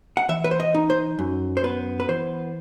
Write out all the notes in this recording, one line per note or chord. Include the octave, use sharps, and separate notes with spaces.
F#5
E3 E5
B4
C5
D#5
D#4
C5
F#2
C5
B3 B4
B4
E3 C5